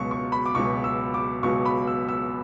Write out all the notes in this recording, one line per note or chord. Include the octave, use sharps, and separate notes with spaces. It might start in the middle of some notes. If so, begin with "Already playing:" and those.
Already playing: C#2 B2 F#3 C#6
C#6
B5
D6
C#2 B2 F#3 C#6
E6
D6
C#2 B2 F#3 C#6
B5
E6
E6